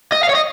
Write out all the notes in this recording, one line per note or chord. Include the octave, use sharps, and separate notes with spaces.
D#5
F5
C#5
D#5